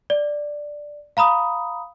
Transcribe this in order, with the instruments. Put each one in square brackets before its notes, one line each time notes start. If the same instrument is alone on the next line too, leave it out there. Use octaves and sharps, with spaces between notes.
[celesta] D5
F5 A#5 B5 D#6